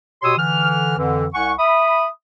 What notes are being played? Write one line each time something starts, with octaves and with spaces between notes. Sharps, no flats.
B2 G4 C#5 C6 D#6 E6
D3 E3 F6
F2 D3 E3
C2 F#5 G#5 C#6
E5 B5 D#6